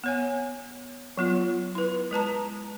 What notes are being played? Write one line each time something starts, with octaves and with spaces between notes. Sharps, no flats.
B3 C#5 G#5
F#3 B3 F4
E4 B4
G#3 B4 A5 A#5